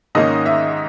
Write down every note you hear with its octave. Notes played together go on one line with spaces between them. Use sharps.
G#2 D#3 A#3 C#4 D#5
E5